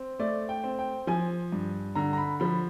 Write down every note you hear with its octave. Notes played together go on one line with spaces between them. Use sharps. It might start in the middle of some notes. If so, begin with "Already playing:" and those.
Already playing: C4
A3 D5
G5
C4
G5
F3 G#5
G2
D3 A#5
A#5
B5
F3 B5